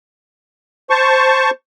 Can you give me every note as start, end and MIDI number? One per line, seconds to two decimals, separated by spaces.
0.90 1.50 72
0.90 1.50 81
0.90 1.50 85